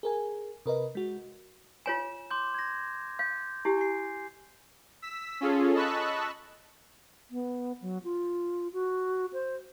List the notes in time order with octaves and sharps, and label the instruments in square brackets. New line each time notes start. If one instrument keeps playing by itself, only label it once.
[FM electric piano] G#4 A#4 G#5
C3 A#4 B4 D#5
G#3 F#4
[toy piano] F4 C#5 G#5 [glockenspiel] E7
[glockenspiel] C6 D6 G6
G#6 A#6
[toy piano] F5 [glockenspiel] G6
[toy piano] E4 G4 [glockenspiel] G#5
[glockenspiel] G#5 C7
[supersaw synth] E6 B6
C#4 F4 G#4 A4
D#5 A5 B5 C#6 E6 F#6
[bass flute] B3
F#3
F4
F#4
C5